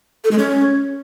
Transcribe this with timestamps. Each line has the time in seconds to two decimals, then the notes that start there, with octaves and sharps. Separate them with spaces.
0.24 A4
0.31 G#3
0.38 C#4